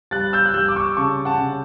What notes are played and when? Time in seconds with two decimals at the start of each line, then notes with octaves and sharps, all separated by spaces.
0.11 G3 F#6 A6
0.33 E6 G6
0.45 F#6
0.54 G3 E6 G6
0.68 D6
0.76 C#6 E6
0.97 C#3 A5 C#6
1.25 F#5 A5
1.40 C#3